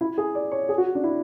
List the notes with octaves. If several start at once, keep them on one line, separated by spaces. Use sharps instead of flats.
E4
G#4
D5
C#5
G#4
F#4
D4
E4